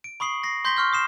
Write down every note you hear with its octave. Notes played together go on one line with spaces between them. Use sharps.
D7
B5 C#6 D#6 C7 F#7
A#6 C7
C6 G6 A#6 B6 G7
C6 C#6 F6 G6
D#6 C7 E7